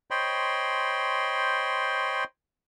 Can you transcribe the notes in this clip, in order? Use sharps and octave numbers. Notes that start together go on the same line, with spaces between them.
C5 C#5 D#5 G5 B5 C6